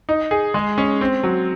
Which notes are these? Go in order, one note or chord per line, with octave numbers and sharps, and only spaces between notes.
D#4
G#4
G#3
C#4
C4
F#3